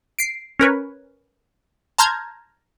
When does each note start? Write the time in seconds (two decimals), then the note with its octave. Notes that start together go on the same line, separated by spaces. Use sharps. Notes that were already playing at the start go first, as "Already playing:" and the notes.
0.19 C7 D7
0.59 C#4 A#4 B4 C#5
1.98 A5 A#5 C6 F6 G6 G#6